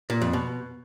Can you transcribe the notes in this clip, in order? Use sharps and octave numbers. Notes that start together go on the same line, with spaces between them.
A#2
F2
B2